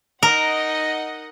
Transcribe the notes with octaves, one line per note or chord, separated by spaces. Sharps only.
D#4 A#4 D#5 F#5